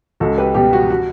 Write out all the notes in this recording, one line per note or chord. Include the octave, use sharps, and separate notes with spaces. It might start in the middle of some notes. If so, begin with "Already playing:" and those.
C#2 F#4 A4
G4 B4
B2 G3 G4
F#4
F#4